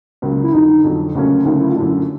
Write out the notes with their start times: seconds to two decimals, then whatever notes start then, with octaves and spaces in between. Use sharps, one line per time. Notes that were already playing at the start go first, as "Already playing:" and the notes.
0.22 C#2 C#3 F#3 A#3
0.43 E4
0.53 F2 D3 F#3 D#4
0.84 F2 D3 F#3
1.15 D2 C#3 F#3 A#3 C#4
1.45 D2 C#3 F#3 A#3 C#4 D#4
1.60 E4
1.69 F4
1.76 F#2 D3 F#3 A3 E4